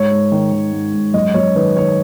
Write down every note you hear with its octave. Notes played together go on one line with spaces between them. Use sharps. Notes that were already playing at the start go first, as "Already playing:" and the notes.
Already playing: G#2 C#5
G#2
D#3
D#3
G#2
G#2
F#2 D#5
F#2 C#5
D#3 B4
D#3 C#5